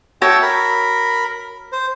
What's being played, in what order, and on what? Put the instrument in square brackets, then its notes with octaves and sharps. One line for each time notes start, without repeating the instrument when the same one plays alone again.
[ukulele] F#4 C#5 [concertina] E5 G5 A5
[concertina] A#4 B5
C5